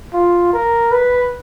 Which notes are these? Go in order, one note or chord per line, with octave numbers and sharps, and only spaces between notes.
F4
A#4
B4